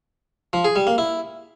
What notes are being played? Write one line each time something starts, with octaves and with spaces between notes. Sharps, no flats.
F3
G#4
G3
A#3
E4